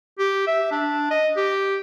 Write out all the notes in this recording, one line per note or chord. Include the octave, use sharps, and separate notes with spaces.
G4
E5
D4
D#5
G4